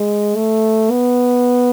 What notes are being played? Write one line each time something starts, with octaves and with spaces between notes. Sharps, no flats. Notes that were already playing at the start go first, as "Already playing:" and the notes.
Already playing: G#3
A3
B3